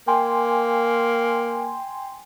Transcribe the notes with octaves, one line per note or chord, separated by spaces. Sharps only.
A#3 G5 G#5 C6